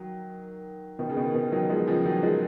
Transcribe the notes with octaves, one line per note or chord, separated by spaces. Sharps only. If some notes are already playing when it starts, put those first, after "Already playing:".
Already playing: D#3 F#3
B2 D#3
C#3
B2 D#3
B2 D#3
D#3 F#3
F3 G#3
C#3 F3
D#3 F#3
F3 G#3